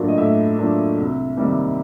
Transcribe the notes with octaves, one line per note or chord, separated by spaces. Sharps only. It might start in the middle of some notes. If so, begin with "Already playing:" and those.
Already playing: A2 F#3 A#3 D4 F4
D#5
A2 E5
F#3 A#3 D4 F4
C2
C3 D#3 G3 A#3